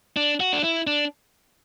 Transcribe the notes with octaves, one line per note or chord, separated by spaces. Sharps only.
D4
F#4
D4
E4
D4